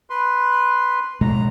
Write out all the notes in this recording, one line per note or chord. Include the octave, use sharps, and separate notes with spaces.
B4 C6
B2 G#3 A3 A#5